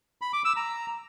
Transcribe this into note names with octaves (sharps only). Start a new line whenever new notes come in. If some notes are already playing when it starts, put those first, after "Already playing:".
B5
D6
E6
A#5